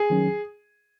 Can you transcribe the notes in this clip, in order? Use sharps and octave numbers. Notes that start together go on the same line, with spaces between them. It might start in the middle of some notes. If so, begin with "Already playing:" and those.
Already playing: G#4
D#3 F#3 C#4